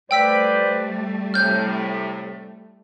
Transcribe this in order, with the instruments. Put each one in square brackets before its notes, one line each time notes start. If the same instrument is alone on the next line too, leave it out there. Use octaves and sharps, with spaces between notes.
[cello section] G3 A3 [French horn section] B4 C5 D5 [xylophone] G5 E6 B6
[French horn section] A2 C3 [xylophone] F6 G6